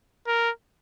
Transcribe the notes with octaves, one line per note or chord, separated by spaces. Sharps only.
A#4